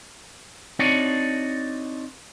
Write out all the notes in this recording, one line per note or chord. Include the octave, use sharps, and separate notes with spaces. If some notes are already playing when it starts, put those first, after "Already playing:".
C4 D4 D#4 F#4 C#5 D5